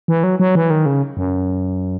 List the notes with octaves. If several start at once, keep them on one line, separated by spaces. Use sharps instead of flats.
E3
F#3
F#3
E3
D#3
C#3
F#2